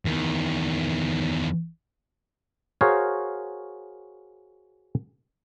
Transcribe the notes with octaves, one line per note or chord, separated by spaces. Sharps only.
E2 D#3
F#4 G#4 A#4 C5 C#5 F5